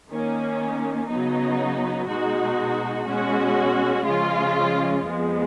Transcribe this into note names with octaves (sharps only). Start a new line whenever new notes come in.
D#3 A#3 C#4
C#3 F#3 B3 D#4
B2 G#3 D#4 F#4
B2 G#3 C#4 F#4
C#3 F3 G#3 C#4 F4
F2 F3 G#3 B3